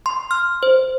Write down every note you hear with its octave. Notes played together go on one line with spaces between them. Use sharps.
C6
F6
C5